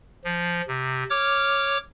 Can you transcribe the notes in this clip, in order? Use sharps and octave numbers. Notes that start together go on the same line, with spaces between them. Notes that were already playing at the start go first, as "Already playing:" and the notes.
F3
C3
C#5 D6 F6